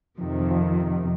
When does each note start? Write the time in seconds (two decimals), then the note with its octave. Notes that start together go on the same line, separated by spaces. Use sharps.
0.18 F2 C3 D#3 F3
0.41 F3
0.51 F3